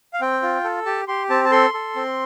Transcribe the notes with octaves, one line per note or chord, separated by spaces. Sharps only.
F5
C4 G5
F4
A4
G4 A5
G4 C6
C4 A5
A5
A4 C6
A4
C4